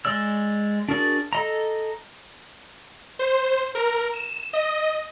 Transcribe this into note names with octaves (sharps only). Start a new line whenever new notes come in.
G#3 D5 E6
D4 F#4 G#4 A#4 D5
A4 D#5 A#5
C5
A#4
E7
D#5